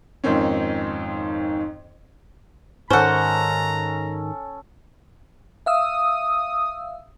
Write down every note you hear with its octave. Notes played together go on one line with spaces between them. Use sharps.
F2 G#2 D#3 C4 C#4
G#2 D#3 C#4 A4 C5 F#5 A#5
E5 F5 D#6 E6